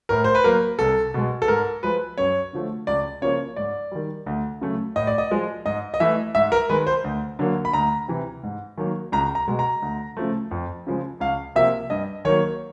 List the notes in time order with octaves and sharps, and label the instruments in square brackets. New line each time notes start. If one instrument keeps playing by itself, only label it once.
[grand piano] A2 A#4
C5
B4
F#3 A#3 A#4
C2 A4
B2 G#3
A4
G#2 A#4
F3 G#3 B4
F#2 C#5
D3 F3 A3
C#2 D5
C#3 F3 A#3 C#5
G#2 D5
D#3 G3
D2
C#3 F#3 A3
A2 D#5
D5
D#5
F3 G#3
G#2 D#5
D#5
E3 A3 E5
G#2 E5
A#4
D#3 G#3 B4
C5
D2
D3 F#3 A#3
B5
D2 A#5
C3 E3
G#2
D#3 F#3 A#3
C#2 A#5
A#5
B2 G#3
A#5
D2
C#3 F3 A3
F2
C#3 F3 G#3
C#2 F5
C3 F3 A#3 E5
G2 D#5
D#3 F#3 A#3 C#5